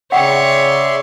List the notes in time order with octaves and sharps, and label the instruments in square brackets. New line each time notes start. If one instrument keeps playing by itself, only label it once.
[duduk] C#3 [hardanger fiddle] C#5 [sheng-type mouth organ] D5 E5 C6 [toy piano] F#5 G5